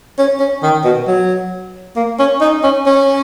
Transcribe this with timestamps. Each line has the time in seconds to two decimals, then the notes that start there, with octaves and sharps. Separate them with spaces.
0.18 C#4
0.40 C#4
0.63 D#3
0.84 B2
1.07 F#3
1.96 A#3
2.19 C#4
2.41 D#4
2.63 C#4
2.86 C#4